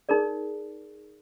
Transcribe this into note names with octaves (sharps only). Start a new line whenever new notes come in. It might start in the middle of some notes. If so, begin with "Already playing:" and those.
D#4 G#4 A#4 D5